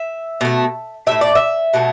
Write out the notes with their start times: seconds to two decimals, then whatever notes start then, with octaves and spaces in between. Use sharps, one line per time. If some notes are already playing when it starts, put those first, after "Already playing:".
Already playing: E5
0.41 B2 A3
1.07 F#3 A3 E5
1.11 A2
1.21 D5
1.35 E5
1.73 B2 F#3 A3